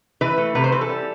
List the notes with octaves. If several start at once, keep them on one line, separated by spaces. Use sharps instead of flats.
E3 B4
A3
C3 B4
C5
E3 B4
A4
G3